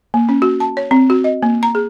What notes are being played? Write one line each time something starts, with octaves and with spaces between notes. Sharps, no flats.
A#3
C#4
F#4
A5
C#5
C4
F#4
D#5
A#3
A#5
G#4